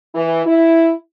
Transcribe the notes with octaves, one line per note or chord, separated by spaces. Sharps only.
E3
E4